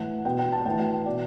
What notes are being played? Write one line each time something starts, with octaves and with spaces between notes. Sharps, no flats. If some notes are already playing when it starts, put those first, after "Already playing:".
Already playing: A2 E3 F#5
B2 G5
G5
A5
A2 E3 G5
G5
B2 D5